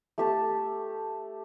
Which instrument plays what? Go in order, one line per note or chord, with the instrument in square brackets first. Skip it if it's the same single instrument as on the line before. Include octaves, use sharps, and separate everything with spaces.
[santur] A3 G4 A5